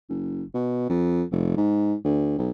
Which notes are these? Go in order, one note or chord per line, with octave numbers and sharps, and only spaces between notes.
F#1
B2
F2
F1
G#2
D2
B1